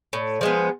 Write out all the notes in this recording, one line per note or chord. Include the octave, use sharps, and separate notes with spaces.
A2
F3 G#3 B3